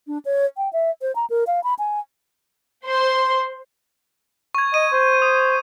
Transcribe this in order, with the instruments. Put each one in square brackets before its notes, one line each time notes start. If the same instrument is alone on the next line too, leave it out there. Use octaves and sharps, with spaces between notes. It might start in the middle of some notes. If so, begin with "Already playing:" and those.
[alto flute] D4
C#5
G5
E5
C5
A#5
A#4
F5
B5
G#5
[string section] C5 C6
[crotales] C#6 G#6
[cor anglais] D#5 [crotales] D#7
[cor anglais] C5
[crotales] D#6